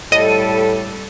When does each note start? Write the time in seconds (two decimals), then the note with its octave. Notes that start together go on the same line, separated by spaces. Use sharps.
0.12 A2 G3 A4 D#5 D#7